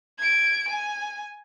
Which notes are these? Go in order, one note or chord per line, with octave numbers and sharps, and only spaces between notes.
G#6 D7
G#5